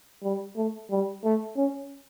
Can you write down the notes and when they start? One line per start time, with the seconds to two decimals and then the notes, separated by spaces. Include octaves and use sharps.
0.23 G3
0.57 A3
0.91 G3
1.24 A3
1.57 C#4